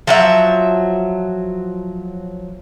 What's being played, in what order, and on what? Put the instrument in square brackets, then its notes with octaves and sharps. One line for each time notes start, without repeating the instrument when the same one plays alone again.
[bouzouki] F3 F#3 E5